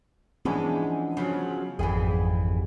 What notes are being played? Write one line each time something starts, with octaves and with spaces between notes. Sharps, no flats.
E3 F3 G#3 B3 C#4 D4
C#3 F3 F#3
G#1 F2 E3 G3 G#4